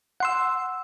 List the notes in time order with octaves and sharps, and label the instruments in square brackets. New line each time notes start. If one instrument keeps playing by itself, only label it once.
[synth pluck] F#5 C6 E6